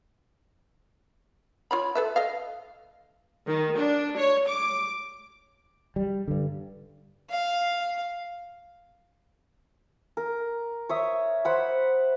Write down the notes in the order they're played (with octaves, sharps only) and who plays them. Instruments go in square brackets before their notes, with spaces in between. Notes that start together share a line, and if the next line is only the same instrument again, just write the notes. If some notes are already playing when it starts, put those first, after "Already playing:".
[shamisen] F4 C#5 B5
A4 B4 E5
A4 D#5 F5
[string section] D#3
D4
C#5
D6
[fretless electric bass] G3
G2 D3
[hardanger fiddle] F5
[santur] A#4
C#5 E5 D#6
C5 F#5 B5